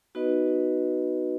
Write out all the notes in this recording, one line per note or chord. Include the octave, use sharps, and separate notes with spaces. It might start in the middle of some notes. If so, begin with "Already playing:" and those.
B3 D#4 F#4 B4 D#5